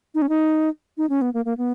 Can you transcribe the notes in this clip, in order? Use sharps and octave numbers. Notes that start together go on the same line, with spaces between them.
D#4
C#4
D#4
D#4
C#4
B3
A#3
A#3
B3